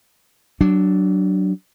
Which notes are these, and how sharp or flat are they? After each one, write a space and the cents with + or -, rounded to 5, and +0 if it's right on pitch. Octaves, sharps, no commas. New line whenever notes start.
F#3 +20 D4 +0